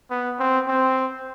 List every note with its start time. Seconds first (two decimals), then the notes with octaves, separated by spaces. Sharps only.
0.10 B3
0.39 C4
0.67 C4